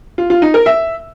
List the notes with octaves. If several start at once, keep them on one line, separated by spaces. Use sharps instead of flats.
F4
F4
D#4
A#4
E5